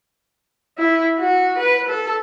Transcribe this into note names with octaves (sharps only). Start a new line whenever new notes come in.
E4
F#4
B4
A4